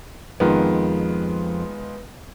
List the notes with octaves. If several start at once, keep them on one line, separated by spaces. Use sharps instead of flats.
F2 D#3 G#3 B3 F4